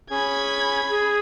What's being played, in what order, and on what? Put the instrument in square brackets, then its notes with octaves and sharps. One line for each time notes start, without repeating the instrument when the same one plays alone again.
[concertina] C#4 G#4 [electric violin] B5 G#6
[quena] G#4